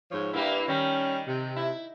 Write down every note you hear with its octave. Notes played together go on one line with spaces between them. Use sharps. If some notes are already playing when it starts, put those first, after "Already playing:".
G#2 F3 C#5
G2 A#3 E4 G4
D#3 G3 C#4
C3
E4